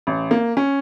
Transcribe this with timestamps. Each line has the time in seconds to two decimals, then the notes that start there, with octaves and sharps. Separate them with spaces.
0.07 A1
0.31 A#3
0.57 C#4